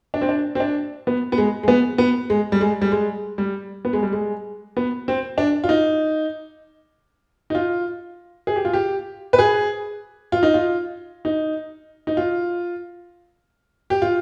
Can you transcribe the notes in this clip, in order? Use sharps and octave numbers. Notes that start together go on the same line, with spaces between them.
D4
C4
D4
C4
D4
B3
B3
G#3
G#3
B3
B3
G#3
G3
G#3
G3
G#3
G3
B3
G#3
G3
G#3
B3
C4
D4
F4
D#4
D#4
F4
G#4
G4
F4
G4
B4
G#4
F4
D#4
F4
D#4
D#4
F4
G4
F4